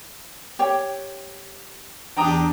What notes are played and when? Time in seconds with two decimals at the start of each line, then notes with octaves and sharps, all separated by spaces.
0.59 G4 C#5 G5
2.17 E2 D4 G4 G5 A#5 D#6